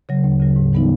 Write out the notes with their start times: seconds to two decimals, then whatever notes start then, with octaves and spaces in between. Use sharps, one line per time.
0.09 C#3 F#3
0.24 D2
0.40 C#3 F#3
0.56 G#2
0.73 E3 G3 B3 D#4